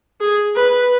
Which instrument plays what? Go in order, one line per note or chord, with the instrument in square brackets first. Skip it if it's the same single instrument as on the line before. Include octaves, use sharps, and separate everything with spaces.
[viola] G#4
B4